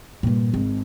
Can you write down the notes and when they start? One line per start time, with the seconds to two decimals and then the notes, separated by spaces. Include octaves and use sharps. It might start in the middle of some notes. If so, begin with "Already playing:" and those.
0.23 G2 A#2
0.54 G#1